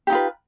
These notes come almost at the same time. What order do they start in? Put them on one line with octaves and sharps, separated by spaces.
G4 D#4 F4 B4